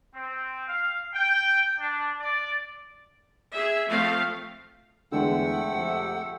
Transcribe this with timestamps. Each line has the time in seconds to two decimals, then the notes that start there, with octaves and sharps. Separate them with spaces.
0.15 C4
0.66 F5
1.14 G5
1.79 D4
2.19 D5
3.53 G#4 E5
3.87 F3 A3 C4 F5
5.12 E2 D3 G#3 A3 F#5 G5 E6
5.71 F2 C3